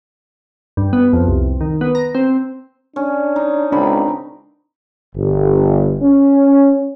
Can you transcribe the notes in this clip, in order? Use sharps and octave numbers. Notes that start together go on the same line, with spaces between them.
G2
B3
F2
C2
D#3
B3
A#5
C4
C#4 D4
D#4
C#2 C4 D4 A#4 B5
G1
C#4